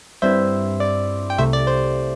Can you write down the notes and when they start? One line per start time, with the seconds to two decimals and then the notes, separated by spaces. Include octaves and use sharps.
0.22 G2 G3 C4 E4 C5 E5
0.80 D5
1.30 G5
1.38 C2 C3 A3 C5 E5
1.53 D5
1.67 C5